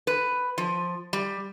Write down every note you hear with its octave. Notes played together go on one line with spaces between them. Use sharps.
B4
F3
G3